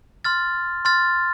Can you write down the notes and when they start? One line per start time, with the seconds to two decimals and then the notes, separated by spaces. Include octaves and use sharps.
0.25 C6 F6 A6
0.85 C6 F6 A6